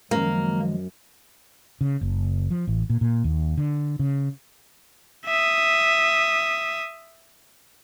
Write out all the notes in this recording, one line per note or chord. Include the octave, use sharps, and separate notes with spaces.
F#2 D#3 F3 G#3 A#3
C#3
F#1
F3
A1
A#2
A#2
D#2
D3
C#3
E5 D#6